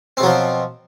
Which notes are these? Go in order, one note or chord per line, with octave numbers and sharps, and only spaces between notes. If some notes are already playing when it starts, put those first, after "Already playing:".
B2 F3 F#3 C4